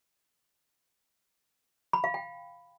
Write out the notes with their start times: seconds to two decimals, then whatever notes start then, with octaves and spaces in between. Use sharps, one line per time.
1.93 B5
2.04 F5
2.14 G5